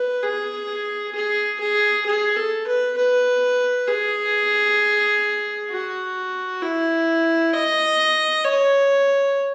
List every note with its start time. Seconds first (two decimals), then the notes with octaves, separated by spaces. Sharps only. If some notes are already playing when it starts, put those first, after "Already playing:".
Already playing: B4
0.23 G#4
1.15 G#4
1.60 G#4
2.06 G#4
2.36 A4
2.67 B4
2.97 B4
3.88 G#4
5.70 F#4
6.62 E4
7.53 D#5
8.44 C#5